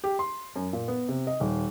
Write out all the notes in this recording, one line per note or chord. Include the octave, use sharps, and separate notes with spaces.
G4
C6
F#2
A#2
B3
C3
D#5
D#1